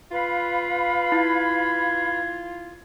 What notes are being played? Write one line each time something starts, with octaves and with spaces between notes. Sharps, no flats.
F4 B4 F5 B5
E4 G#6